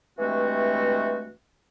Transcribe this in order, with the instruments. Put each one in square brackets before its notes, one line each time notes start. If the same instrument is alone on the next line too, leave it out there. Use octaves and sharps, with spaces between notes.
[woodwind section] G2 E3 G#3 A3 C4 F#4